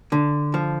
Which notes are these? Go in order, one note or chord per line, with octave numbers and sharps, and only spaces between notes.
D3
F3